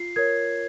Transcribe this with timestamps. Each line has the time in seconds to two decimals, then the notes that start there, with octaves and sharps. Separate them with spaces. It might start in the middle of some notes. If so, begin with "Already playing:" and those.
Already playing: F4 C7
0.16 A#4 C#5 G#6